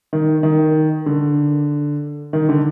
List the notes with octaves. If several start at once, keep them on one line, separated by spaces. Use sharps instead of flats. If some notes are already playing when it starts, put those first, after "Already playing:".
D#3
D#3
D3
D#3
D3